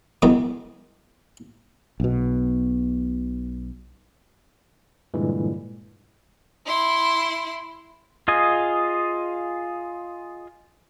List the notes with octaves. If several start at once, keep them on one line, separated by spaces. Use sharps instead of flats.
F#2 B2 D#3 E3 G#3 B3
B1 B2
G2 A#2 D3 E3 G3 G#3
E4 C6
F4 G#4 D#5 G#5